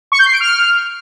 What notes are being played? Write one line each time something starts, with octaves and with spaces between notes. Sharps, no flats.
C#6
G6
C7
D7
F6